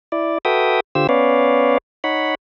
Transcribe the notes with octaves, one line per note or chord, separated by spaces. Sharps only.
E4 D5
F#4 A4 B4 E5 G5 D#6
D3 F4 G4 C5 E6
B3 C#4 B4 C#5 D5 F5
D#4 C#5 F#5 B5